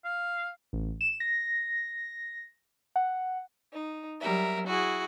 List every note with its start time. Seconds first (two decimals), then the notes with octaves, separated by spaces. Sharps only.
0.05 F5
0.73 A1
1.01 E7
1.20 A#6
2.96 F#5
3.73 D#4
4.21 F#3 G3 A#4 E5
4.67 E4 F#4 G#4